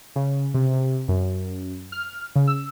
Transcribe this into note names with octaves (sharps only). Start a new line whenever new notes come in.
C#3
C3
F#2
F6
C#3
E6